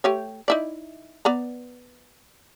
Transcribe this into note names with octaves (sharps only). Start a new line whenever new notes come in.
A3 G4 C#5
D#4 E4 D5
B3 D5 A#5